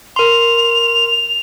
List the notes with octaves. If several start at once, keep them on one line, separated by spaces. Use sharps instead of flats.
A#4 C6 F7